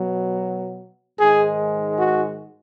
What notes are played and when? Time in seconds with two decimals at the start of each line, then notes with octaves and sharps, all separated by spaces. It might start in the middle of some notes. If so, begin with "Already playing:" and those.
Already playing: B2 F#3
1.19 G#2 D#3 G#3 G#4
1.99 F#4